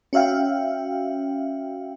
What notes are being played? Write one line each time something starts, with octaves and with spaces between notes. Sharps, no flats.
C#4 F#4 E5 F5 G5